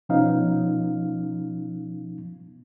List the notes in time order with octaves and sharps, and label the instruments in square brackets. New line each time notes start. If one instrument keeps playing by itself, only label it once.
[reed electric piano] B2 F3 B3 C#4 D#4 F5